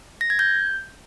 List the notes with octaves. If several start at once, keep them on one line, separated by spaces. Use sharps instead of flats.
A#6
G#6
G6